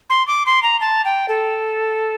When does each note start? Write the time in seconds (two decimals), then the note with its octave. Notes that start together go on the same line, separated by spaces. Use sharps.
0.10 C6
0.27 D6
0.46 C6
0.63 A#5
0.81 A5
1.05 G5
1.29 A4